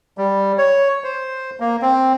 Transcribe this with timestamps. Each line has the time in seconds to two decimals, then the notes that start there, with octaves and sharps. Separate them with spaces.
0.18 G3
0.58 C#5
1.04 C5
1.60 A#3
1.82 C4